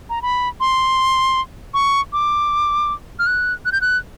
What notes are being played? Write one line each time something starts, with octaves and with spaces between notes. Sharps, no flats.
A#5
B5
C6
C#6
D6
F6
F#6
F#6
G6
F#6